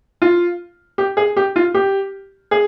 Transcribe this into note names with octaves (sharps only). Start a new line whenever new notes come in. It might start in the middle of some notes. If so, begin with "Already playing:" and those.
F4
G4
G#4
G4
F4
G4
G#4